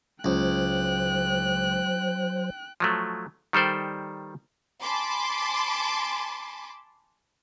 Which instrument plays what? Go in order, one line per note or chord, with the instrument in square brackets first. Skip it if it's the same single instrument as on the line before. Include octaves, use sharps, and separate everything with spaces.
[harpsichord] C#2 [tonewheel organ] F#3 C5 [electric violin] G5 F#6
[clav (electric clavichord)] F3 F#3 A3
D#3 G3 A4 C5 D5
[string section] G#5 A5 B5 C6 D6